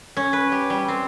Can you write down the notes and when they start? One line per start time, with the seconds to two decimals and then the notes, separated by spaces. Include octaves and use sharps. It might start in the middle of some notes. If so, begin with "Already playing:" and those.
0.17 C#4
0.33 B4
0.52 G4
0.70 G3
0.88 C4